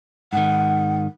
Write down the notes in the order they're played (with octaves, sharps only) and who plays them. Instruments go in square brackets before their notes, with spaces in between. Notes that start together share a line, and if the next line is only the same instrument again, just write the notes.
[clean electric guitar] G#2 D#3 [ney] F#5